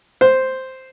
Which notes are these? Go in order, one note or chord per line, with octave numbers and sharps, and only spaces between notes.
C5